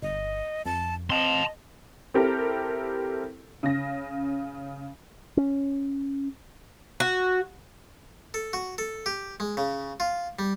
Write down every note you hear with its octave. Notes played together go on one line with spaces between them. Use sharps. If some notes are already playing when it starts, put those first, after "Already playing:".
G1 D#5
F2 A5
C4 D#5 A5 C6
C4 E4 G4 A4 A#4
C#3 A#6
C#4
F#4
A4
F#4
A4
G4
G#3
C#3
F4
G3